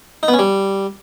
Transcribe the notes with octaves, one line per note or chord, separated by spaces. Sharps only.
D#4
B3
C#4
G3